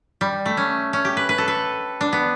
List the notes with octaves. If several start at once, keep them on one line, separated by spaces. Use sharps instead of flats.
G3
A3
C#4
C#4
G4
B4
B4
A4
B4
D4
B3